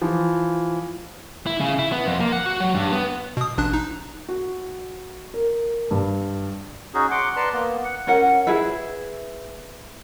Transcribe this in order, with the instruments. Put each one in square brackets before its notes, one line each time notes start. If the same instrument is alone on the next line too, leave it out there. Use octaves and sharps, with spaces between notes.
[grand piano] E3 F3
[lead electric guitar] E4
C#3
E4
B3
F2
A#3
F#5
F#4
F#3
G2
B3
[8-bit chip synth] B2 D#6
A1 D4 F#6
D#4
[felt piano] F#4
A#4
G2
[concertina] C#4 D#4 F#4 G#4
F#5 C6 D6
B4 D5 A5 A#5 C6
A#3 B3
F#5
[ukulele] C#4 A#4 F#5
E4 G#4 B4 E5